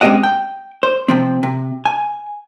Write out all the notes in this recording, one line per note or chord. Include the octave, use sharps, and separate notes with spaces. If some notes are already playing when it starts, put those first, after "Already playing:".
G#3 C4 C#4 G4 D#5 F#5
G5
C5
C3 F3 C4
C3
G#5